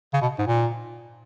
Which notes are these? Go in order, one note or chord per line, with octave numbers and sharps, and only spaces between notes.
C#3
B2
G#2
A#2